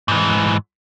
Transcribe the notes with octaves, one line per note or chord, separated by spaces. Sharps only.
G#2 E3